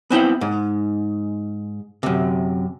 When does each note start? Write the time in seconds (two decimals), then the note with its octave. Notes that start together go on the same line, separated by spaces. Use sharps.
0.10 B3 C4 E4 G5
0.41 G#2
2.03 F#2 C3